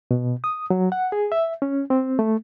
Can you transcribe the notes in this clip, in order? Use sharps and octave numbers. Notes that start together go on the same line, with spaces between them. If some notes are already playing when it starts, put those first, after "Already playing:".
B2
D#6
F#3
F#5
G#4
E5
C#4
C4
A3